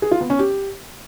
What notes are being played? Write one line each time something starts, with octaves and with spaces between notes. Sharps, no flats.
G#4
F4
B3
C#4
G4